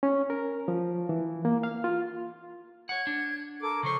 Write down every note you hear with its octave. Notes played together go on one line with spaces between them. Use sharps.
C#4
A#4
F3
E3
A#3
F5
F4
C#5 F#5 G#6
D4
A4 A#4 D6
C#3 F3 C5 C#6